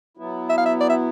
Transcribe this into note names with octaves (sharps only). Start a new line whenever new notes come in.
F#3 B3 E4
E5
F5
E5
D5
E5